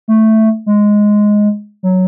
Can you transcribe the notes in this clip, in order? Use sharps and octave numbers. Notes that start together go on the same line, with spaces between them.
A3
G#3
F#3